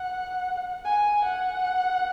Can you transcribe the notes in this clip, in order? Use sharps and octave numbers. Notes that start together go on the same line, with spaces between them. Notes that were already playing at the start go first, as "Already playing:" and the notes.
Already playing: F#5
G#5
F#5